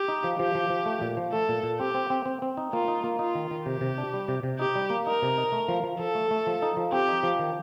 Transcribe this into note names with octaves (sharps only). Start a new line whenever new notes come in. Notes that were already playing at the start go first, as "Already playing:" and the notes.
Already playing: G4
D#4
F3
F3 G4
F3
F3
A3
A#2
F3
A3 A4
A#2
A#2
C4 G4
C4
C4
C4
C4
D#4
A#3 F4
D#4
A#3
D#4 F4
D#3
D#3
C3 G4
C3
D4
G3
C3
C3
D#4 G4
G3
A#3
D#4 A#4
C3
D#4
A3
F3
F3
F3 A4
A3
A3
F3
D#4
F3
C4 G4
D#4
F3
D#3